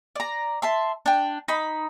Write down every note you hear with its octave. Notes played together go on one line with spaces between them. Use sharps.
D5 A#5
E5 A5 C6
D4 G5
D#4 B5